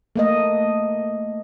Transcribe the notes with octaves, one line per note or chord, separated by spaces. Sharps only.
A3 A#3 D#5